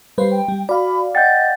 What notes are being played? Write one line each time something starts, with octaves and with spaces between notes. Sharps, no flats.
G3 B4 C5 F5
G5
G3
F#4 D5 F5 B5
D#5 F#5 G5 G6 A6